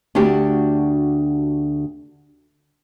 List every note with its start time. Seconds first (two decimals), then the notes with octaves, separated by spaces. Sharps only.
0.15 D2 D4 F#4 G4